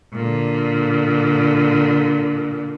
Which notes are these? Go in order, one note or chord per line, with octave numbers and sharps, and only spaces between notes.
A#2 D3